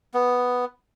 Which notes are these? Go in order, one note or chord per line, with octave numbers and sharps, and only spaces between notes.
B3